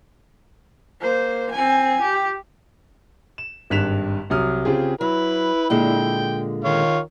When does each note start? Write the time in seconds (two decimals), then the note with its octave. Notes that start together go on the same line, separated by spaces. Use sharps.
1.01 A#3 C5
1.51 C4 G#5
2.01 G4
3.38 E7
3.70 G#1 G2 F#6 B6 E7 F7
4.30 C2 F#3 D#6 F6
4.65 C#3 C4 F4 G4 G#4
5.01 F#3 E4 B4
5.70 A#2 D3 G#3 G5
6.65 D#3 F4 C#5